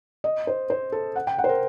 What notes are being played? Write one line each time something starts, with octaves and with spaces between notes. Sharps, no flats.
D#5
C5
C5
A4
F#5
G5
F#5
C5
A#4